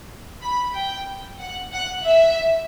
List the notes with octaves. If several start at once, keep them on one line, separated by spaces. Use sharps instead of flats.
B5
G5
F#5
F#5
E5